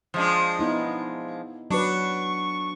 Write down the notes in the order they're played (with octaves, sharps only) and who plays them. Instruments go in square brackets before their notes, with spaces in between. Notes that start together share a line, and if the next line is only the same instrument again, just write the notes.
[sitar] F3 G#3 D4
[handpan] B3 D#4 E4
[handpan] F#3 B4 [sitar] D4 [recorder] C#6